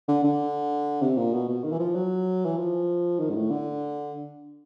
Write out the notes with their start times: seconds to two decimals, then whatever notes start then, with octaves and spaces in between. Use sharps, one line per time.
0.08 D3
0.24 D3
1.01 C3
1.17 A#2
1.33 B2
1.49 B2
1.64 D#3
1.72 E3
1.79 F3
1.95 F#3
2.45 E3
2.57 F3
3.19 D#3
3.30 G#2
3.35 A2
3.50 D3